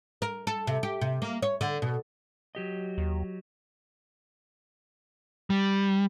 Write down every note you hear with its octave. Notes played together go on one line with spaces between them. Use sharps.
A#4
A4
C3
G4
C3
A#3
C#5
D3
B2
F#3 G4 D#5
D#2
G3